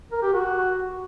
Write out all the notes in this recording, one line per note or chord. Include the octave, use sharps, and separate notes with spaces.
A#4
G4
F#4